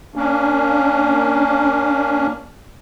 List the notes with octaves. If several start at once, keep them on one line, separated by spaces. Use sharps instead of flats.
A#3 C#4 D4